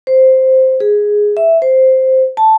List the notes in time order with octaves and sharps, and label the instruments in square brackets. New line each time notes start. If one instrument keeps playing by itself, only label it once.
[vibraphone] C5
G#4
E5
C5
A5